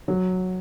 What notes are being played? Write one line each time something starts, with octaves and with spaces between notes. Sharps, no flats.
F#3